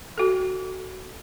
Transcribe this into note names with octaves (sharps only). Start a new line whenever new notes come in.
F#4 A4